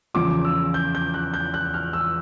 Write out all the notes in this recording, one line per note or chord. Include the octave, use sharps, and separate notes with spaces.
E2 C#3 F3 D6
E6
G6
G6
F#6
G6
F#6
F6
E6